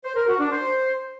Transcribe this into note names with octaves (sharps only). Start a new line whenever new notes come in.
C5
A#4
F#4
D4
C5